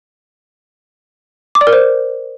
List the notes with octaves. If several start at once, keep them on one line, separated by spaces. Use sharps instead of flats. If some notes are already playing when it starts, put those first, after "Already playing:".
D6
D5
A#4
C5